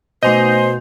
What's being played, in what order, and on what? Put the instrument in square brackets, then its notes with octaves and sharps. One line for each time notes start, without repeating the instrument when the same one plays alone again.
[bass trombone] B2 [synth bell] A3 G#5 G6 [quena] C5 [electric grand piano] D#5